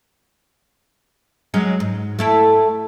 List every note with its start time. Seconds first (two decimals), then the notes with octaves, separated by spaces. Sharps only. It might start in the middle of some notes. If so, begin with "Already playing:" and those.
1.54 F#3 G#3 C#4
1.80 G#2
2.19 A3 E4 A4